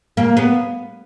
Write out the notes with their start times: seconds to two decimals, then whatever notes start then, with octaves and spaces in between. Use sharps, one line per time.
0.17 A#3
0.37 B3